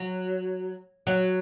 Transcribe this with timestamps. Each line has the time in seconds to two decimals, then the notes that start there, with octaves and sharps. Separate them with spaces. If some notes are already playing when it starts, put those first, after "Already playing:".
Already playing: F#3
1.07 F#3